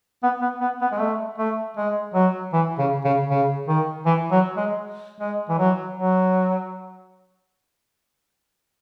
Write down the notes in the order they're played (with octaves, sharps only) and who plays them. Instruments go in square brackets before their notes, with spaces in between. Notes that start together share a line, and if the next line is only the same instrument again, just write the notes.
[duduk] B3
B3
B3
B3
G#3
A3
A3
G#3
F#3
E3
C#3
C#3
C#3
D#3
E3
F#3
G#3
G#3
E3
F#3
F#3